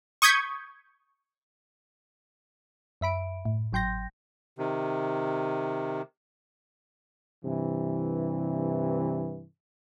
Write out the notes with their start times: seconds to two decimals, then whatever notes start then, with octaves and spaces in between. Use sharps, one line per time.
0.22 C#6 D#6 G6 G#6 B6
3.01 F#2 E5 B5 D7
3.45 A2
3.73 G#1 F#3 G5 C6 G6 A#6
4.58 C3 D#3
7.44 G2 C3 E3